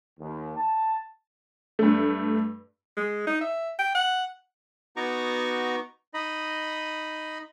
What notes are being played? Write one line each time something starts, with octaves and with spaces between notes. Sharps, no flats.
D#2
A5
G2 A3
G#3
D#4
E5
G5
F#5
B3 D#4 F#4 A#5 C#6 D6
D#4 D#5 B5